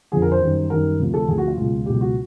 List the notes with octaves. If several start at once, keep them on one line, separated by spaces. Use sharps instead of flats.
F2 D3 F3 G#4
A#4
C5
F#2 D#3 G3
F#2 D#3 G3 A#4
D2 C3 F3
A4
D2 C3 F3 G#4
F#4
F4
C#2 B2 F#3
C#2 B2 F#3 G4
F#4